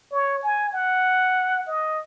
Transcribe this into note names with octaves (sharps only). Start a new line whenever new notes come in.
C#5
G#5
F#5
D#5